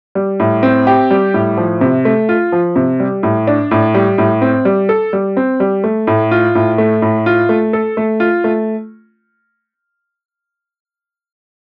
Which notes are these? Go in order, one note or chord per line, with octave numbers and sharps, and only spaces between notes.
G3
A2
C4
G4
G3
A2
F3
C3
A3
F4
F3
C3
G3
A2
D4
A2
G3
A2
C4
G3
A4
G3
C4
G3
A3
A2
F4
A2
A3
A2
F4
A3
A4
A3
F4
A3